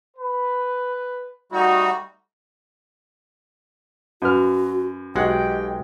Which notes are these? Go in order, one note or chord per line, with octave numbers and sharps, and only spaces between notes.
B4
G3 A3 D#4 F#4
F#2 F#4 B4 F6
B1 G#3 F#4 G4 D#5 F#5 G5